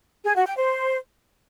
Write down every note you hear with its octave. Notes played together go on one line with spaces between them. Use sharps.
G#4
F#4
G5
C5